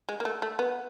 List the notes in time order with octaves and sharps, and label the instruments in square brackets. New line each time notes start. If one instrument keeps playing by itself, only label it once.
[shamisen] G#3
A#3
A3
A3
B3